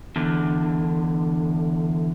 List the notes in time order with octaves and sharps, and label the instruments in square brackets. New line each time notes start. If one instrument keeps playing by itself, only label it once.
[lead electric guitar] E2 D3